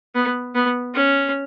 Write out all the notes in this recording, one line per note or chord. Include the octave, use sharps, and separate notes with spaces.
B3
B3
C#4